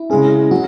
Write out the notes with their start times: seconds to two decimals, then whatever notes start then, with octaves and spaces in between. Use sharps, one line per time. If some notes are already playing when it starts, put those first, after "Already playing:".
Already playing: E4
0.10 C#3 G#3 C#4 G#4
0.51 F#3 F#4